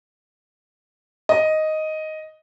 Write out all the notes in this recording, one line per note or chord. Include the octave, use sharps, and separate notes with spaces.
D#5